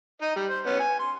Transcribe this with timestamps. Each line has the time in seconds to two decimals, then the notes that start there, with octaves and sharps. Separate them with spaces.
0.22 D#4 D#5
0.36 G3
0.49 C5
0.66 B3 C#4
0.79 G#5
0.99 C6